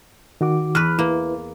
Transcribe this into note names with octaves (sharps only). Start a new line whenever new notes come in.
D#3 F#4 D6
E2 B4 F6 F#6
A#3 E4 B4